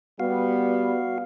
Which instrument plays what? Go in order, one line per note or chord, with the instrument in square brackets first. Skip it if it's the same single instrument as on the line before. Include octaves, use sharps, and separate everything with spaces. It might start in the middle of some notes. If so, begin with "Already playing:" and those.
[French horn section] G3 B3 [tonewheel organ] F#4 F5